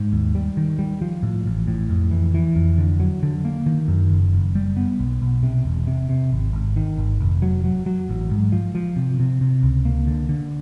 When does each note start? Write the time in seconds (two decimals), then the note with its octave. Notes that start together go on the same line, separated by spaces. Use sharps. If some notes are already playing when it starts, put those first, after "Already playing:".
Already playing: G#2
0.13 D#2
0.35 G3
0.57 D#3
0.79 G3
1.02 F3
1.23 A2
1.46 A1
1.68 A2
1.90 F2
2.11 E3
2.34 E3
2.56 F2
2.78 D3
3.00 F#3
3.23 D3
3.45 A#3
3.66 D#3
3.88 F#2
4.10 F#1
4.33 F#1
4.55 G3
4.77 B3
4.99 B1
5.22 B1
5.43 C3
5.65 E1
5.87 C3
6.09 C3
6.32 G#1
6.53 G#1
6.76 D#3
6.98 G#1
7.20 F1
7.42 F#3
7.64 F#3
7.86 F#3
8.09 A1
8.31 G#2
8.52 F3
8.75 F3
8.96 C3
9.20 C3
9.41 C3
9.63 C#2
9.85 A#3
10.07 D3
10.29 D3